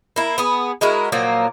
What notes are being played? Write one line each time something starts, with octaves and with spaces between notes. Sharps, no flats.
A#3 E4
B3 G#4
G#3 E4 F#4 A#4
A#2 F3 F#3 A#3